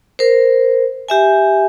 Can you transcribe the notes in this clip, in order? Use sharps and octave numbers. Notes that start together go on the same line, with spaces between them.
A#4 C5
G4 E5 G#5